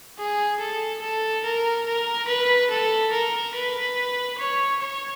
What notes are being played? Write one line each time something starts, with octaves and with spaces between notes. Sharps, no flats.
G#4
A4
A4
A#4
A#4
B4
A4
A#4
B4
C#5
C#5